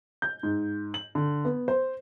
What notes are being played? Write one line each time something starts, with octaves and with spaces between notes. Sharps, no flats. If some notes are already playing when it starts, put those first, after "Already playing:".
G6
G#2
F#7
D3
B3
C5